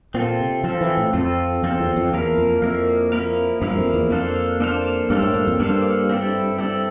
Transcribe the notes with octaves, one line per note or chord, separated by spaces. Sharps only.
A#2 C4 F4 A4
C3
F3 C4 F4 A4
E3
A2
F2 C4 F4 A4
F2 C4 F4 A4
E2
F2
E2 F3 A#3 E4 A#4 F5
F2
F2 F3 A#3 E4 A#4 F5
F3 A#3 E4 A#4 F5
G2 F3 A#3 E4 A#4 F5
F2
E2
F2 A#3 D4 A4 C5 F5
A#3 D4 A4 C5 F5
G2 A#3 D4 A4 C5 F5
A2
G2
F2
G2 A#3 D4 A4 C5 F5
C4 E4 A4 D5
C4 E4 A4 D5